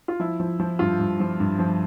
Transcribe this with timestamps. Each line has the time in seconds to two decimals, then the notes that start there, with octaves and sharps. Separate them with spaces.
0.08 F4
0.20 F3 E4
0.40 F3
0.60 F3
0.79 G2 F4
0.99 G2
1.20 F3
1.40 G2
1.59 F3